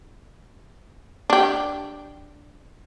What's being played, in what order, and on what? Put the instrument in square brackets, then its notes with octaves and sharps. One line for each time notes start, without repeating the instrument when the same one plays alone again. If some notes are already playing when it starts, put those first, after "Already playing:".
[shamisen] D4 G4